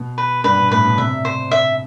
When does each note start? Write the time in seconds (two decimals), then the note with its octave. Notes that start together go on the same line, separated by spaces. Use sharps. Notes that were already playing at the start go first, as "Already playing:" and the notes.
Already playing: B2
0.18 B4
0.44 G2 B4
0.58 B2
0.71 A2 B4
0.84 B2
0.98 C3 E5
1.25 C5
1.51 E5